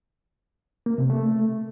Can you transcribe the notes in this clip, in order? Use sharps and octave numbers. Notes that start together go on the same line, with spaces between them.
A#3
C3
A3